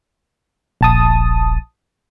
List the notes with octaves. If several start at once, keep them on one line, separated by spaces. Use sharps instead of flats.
D#1 A#1 A5 D#6